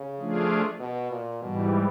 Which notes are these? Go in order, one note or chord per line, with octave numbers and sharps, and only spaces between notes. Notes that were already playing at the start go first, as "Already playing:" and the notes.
Already playing: C#3
F3 A3 D4 F4 G#4
B2
A#2
G#2 B2 E3 G3